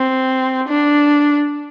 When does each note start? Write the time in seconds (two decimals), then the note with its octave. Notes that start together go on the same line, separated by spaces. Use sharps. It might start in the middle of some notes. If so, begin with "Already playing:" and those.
Already playing: C4
0.68 D4